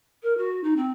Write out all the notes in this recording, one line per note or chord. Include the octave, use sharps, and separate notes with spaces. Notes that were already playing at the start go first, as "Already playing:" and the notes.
A#4
F#4
D#4
C4